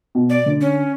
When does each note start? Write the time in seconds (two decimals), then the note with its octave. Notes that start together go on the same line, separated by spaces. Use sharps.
0.15 B2
0.30 D5
0.46 D3
0.61 C#4